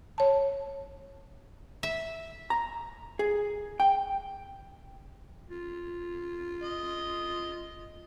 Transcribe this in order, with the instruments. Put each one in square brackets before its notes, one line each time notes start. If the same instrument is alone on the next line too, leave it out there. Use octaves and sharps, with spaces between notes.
[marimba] C#5 A5
[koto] E5
[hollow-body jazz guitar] A#5
G#4
G5
[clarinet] F4
[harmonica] D#5